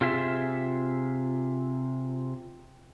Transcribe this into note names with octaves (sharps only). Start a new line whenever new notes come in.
C3 F4 G#4 E5